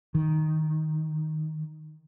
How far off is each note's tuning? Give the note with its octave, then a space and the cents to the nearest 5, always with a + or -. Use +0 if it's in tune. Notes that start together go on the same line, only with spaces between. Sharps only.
D#3 +0